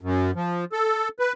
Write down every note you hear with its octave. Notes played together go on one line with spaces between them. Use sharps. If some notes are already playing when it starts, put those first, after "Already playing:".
F#2
F3
A4
B4